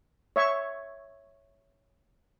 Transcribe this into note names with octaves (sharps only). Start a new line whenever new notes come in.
C#5 E5 C#6